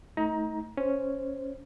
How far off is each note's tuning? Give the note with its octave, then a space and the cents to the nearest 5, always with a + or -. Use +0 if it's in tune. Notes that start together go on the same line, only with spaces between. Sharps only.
A3 +0 D#4 +30 A#5 +15
C#4 +0 C5 +0